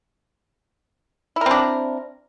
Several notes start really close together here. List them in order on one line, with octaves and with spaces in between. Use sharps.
E4 A#4 C4 D4